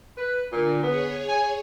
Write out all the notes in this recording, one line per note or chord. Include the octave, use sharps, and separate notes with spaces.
B4
A#2 D3
B3 G#4 C#5
G#5